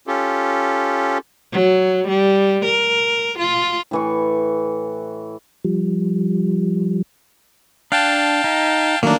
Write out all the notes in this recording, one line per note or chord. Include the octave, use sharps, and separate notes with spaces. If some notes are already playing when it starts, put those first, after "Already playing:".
C#4 F4 G4 A4
F#3
G3
A#4
F4
A2 E3 C#6
F3 G3
D4 F5 G5 A5 F#6
D#4
D#3 F#3 A3 A#3 D4